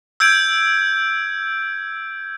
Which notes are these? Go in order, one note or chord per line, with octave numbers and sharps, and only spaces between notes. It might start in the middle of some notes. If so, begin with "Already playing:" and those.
E6 G6 G#6 D7